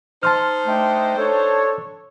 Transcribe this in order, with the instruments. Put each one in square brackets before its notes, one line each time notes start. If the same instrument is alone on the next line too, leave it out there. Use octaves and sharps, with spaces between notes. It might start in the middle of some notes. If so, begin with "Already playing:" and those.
[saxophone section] D#4 C5 [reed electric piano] A5 C6 F6
[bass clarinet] A3 [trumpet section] D4 D#5 G5
[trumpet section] D4 C#5 [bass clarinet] A4